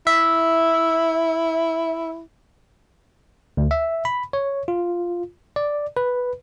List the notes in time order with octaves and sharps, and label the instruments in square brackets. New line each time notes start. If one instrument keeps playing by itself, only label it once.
[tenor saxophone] E4 [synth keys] E5
[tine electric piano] D2
E5
B5
C#5
F4
D5
B4